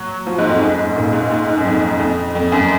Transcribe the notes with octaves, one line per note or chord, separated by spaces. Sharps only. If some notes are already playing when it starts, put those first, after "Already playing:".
Already playing: F#3
F3
G#2
F2
F#2
G#2
A#2
G#2
G#2
G#2
F#2
F2
F2
F2
F#2